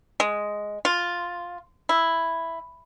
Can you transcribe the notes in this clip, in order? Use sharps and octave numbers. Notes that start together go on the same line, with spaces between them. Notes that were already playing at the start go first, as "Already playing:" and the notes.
G#3
F4
E4